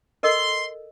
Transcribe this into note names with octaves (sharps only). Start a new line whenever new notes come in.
A4 A#4 D#5 C6